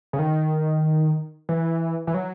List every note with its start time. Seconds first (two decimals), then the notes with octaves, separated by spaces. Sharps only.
0.13 C#3
0.19 D#3
1.49 E3
2.07 E3
2.14 F#3